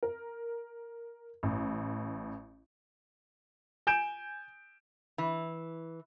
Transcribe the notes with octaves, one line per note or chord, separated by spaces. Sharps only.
A#4
A1
G#5 G6 D7 E7
E3